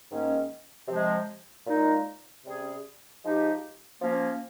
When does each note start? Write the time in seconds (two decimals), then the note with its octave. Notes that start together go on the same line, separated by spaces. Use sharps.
0.11 G#2 D#3 A#3 C#4
0.88 C3 F3 G#3
1.66 A#2 G#3 D#4
2.45 C3 G3 C#4 G#4
3.23 F3 G#3 D#4 G4
4.01 F3 A#3 C#4